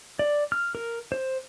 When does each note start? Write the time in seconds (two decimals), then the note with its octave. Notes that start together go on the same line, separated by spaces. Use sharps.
0.19 D5
0.52 F6
0.75 A#4
1.12 C5